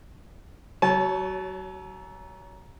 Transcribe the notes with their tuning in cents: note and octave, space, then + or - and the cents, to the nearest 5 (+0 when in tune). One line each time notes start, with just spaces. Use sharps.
F#3 +30 C#5 +0 A5 -25